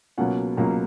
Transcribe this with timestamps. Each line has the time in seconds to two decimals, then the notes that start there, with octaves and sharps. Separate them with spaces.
0.18 C#2 B2 F#3 A#3 C#4 F#5
0.57 C#2 B2 F#3 A#3 C#4 A#5